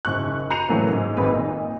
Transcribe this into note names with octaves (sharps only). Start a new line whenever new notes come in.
F#1 G#2 C#6 F#6
A#5 G6 C7 C#7 D#7 F7
A2 C#3 E3 F#3 A3 A#3
G#2
G#1 F2 G#2 B4
A#2 D#4